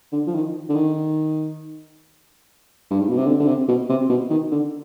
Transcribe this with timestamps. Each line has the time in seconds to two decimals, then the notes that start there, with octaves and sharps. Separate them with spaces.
0.12 D3
0.27 F3
0.34 D#3
0.69 D3
0.75 D#3
2.91 G2
3.00 G#2
3.09 B2
3.17 C3
3.27 D3
3.40 D3
3.48 C3
3.68 B2
3.89 C3
4.09 B2
4.30 D#3
4.52 D3